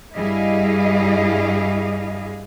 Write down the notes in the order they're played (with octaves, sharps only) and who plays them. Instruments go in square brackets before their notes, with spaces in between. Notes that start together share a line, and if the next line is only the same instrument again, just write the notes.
[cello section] G2 G3 E4 G#4 D#5 F5